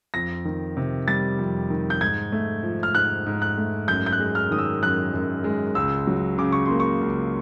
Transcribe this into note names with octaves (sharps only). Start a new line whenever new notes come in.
F2 A#6
D#3
C3
G3 A6
F2
D#3
G6
G#2 G#6
A3
F3
F6
G#2 F#6
G#2
F#6
A3
F#2 G6
G6
F#6
G#3
F6
D#3 D#6
E6
F#2 F#6
F#2
G#3
C#2 E6
F#3
C#3 D6
C#6
A#3 C6
C#6
C#2